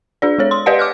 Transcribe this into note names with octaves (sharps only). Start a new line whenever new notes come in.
D4 G#4 D5
G#3 A4 C#5
C6
G4 B4 D5 D#5 F5 F#5
D6 F6 F#6